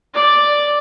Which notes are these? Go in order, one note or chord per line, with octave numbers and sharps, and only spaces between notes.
D5